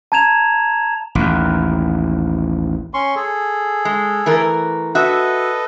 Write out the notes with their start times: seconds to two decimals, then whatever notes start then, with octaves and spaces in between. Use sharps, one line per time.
0.12 A5 A#5 G#6 E7 F7
1.15 A1 D#2
2.94 C#4 C6 C#6
3.16 G#4 A4
3.85 G#3
4.26 E3 A3 A#4
4.95 F#4 A4 B4 D#5 E5